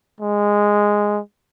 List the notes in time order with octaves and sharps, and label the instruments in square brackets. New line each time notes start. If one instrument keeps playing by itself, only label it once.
[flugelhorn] G#3